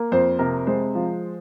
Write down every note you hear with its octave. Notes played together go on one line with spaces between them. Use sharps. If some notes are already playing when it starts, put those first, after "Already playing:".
Already playing: A#3
F2 C5
C3 A#4
G#3 C5
F3